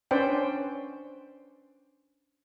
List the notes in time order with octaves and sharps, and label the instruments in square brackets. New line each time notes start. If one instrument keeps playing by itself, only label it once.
[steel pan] C#4 D4 B4 C5 D5 G5